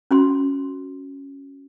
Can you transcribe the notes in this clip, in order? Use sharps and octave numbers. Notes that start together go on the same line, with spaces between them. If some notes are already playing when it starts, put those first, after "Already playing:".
C#4 F#4 C6